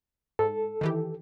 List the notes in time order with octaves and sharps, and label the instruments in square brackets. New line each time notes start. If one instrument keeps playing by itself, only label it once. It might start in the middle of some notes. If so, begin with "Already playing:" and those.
[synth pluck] G#2 [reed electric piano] A4
[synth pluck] D#3 E3 G4